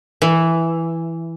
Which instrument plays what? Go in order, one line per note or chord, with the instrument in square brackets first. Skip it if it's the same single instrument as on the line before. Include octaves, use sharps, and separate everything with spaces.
[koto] E3